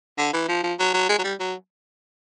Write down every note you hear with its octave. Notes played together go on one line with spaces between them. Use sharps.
D3
E3
F3
F3
F#3
F#3
G#3
F#3
G3
F#3